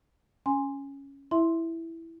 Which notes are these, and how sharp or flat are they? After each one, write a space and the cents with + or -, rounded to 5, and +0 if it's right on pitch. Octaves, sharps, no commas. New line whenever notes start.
C#4 +0 G#5 -10 C6 +0
E4 +0 E5 +0 C6 +0